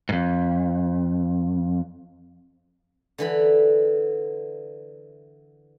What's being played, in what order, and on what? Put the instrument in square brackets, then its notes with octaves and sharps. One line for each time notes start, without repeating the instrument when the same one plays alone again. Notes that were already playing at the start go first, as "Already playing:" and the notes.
[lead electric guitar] F2 G#2
[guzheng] D3 E3 B5